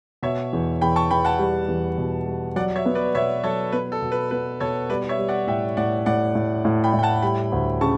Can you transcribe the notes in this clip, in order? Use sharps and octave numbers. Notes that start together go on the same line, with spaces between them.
B2 C#5 E5
E2
E2 G5 B5
A5 C#6
E2 G5 B5
F#5 A5
G3
E2
B2
G3
F#3 D5 F#5
C#5 E5
B3
B4 D5
B2 C#5 E5
F#3 A4 C#5
B3 B4
A4
B2
B4
B3 B4
B2 A4 C#5
G3 B4 D5
C#5 E5
G3
D5 F#5
A2 E5 G5
A2 D5 F#5
A2 D5 F#5
A2
A2
G5 B5
A2
G5
F#5 A5
G3 G5 B5
D2
C#3 A5 C#6